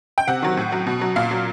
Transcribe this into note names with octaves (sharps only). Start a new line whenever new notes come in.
G5
C3 F#5
D#3 F#3
A2
F#3
B2
F#3
A#2 F5
F#3